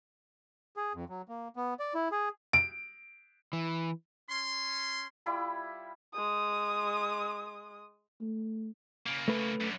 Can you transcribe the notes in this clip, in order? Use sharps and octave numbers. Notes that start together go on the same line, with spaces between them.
G#4
F2
F#3
A#3
B3
D5
E4
G#4
D7
E3
C#4 C6
G3 E4 F4 B5
G#3 D#6
A3
C#3 A#3
A3 B4
F#2 D3